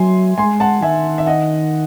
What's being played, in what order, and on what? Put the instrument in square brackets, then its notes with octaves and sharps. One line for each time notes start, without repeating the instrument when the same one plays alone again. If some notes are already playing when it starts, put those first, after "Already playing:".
Already playing: [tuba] F#3 [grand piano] E5 G#5 C6
[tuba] G#3 [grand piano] G#5 C6
[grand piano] F#5 A5
[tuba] D#3 [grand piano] E5 G#5
[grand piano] E5
D#5 F#5